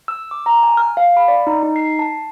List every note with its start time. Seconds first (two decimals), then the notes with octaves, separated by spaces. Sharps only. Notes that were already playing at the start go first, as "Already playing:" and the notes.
0.08 E6
0.31 D6
0.46 A#5
0.63 G#5
0.77 F6
0.97 F5
1.17 B5
1.28 D5
1.47 D#4
1.63 D#4
1.76 C7
1.99 A5